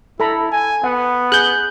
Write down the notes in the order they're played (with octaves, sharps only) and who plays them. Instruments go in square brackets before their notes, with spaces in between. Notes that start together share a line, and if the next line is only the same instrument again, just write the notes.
[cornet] E4 [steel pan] A4 A#5 B5
[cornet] G#5
[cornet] B3 [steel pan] F#5
[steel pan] G#4 [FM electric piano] F#6 G6